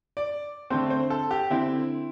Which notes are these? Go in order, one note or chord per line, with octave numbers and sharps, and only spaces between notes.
D5
D3 A3 C4 C5
C5
A4
G4
D3 C4 E4